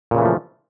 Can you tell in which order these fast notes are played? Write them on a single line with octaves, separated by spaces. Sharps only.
A#2 C#3 E3 A3 F3